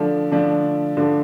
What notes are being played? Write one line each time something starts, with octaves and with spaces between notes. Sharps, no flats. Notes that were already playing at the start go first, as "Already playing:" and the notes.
Already playing: D3 F3 A3 D4
D3 F3 A3 D4
D3 F3 A3 D4